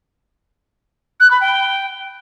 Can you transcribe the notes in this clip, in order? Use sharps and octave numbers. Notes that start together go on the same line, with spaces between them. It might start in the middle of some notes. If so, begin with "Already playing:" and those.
F#6
B5
G5